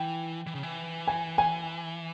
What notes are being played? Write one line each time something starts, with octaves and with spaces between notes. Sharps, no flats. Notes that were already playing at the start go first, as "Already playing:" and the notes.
Already playing: E3 G5
E3
C#3
E3
G#5
G#5